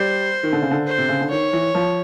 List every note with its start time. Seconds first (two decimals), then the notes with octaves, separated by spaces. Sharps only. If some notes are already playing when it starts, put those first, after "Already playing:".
Already playing: G3 C5
0.43 D#3
0.52 D3
0.62 C#3
0.71 D3
0.87 C5
0.98 C3
1.09 C#3
1.20 D3
1.31 D#3 C#5
1.53 E3
1.75 F3